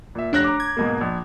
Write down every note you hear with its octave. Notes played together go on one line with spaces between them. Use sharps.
A#2 E5
F1 D4 C#5 F#6 A#6
A#5 D6
G#6
G#2 B2 A#3
A#1